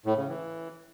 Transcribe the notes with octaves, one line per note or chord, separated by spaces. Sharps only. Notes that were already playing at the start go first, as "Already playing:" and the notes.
A2
C#3
E3